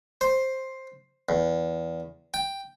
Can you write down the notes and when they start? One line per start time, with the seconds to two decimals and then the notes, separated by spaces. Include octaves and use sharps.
0.21 C5
1.29 E2
2.34 G5